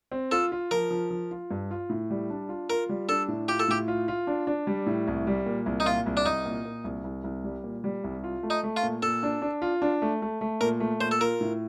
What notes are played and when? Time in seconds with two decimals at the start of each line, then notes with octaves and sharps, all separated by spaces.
0.12 C4
0.31 F4 A4
0.52 F4
0.71 F3 A#4
0.90 F3
1.10 F3
1.31 F4
1.51 G2
1.71 F4
1.89 A2
2.10 G3
2.30 D4
2.49 F4
2.69 F4 A#4
2.89 G3
3.09 D4 A4
3.28 A2
3.48 F4 G4
3.59 A4
3.68 A2 G4
3.88 F4
4.08 F4
4.27 D4
4.47 D4
4.67 G3
4.86 A2
5.07 C2
5.27 G3
5.46 A#2
5.66 C2
5.80 D#4
5.86 A#2 F4
6.06 C2
6.17 D4
6.25 C2 D#4
6.46 A#2
6.65 A#2
6.84 C2
7.04 C2
7.24 C2
7.44 G3
7.64 A#2
7.84 G3
8.04 C2
8.24 F4
8.43 A3
8.50 D#4
8.63 A3
8.77 F4
8.83 A#2
9.03 A#2 A4
9.23 D4
9.42 D4
9.62 F4
9.82 D4
10.02 A3
10.22 A3
10.41 A3
10.61 A#2 A#4
10.80 A3
11.00 A#2 C5
11.11 A4
11.21 F4 A#4
11.41 A2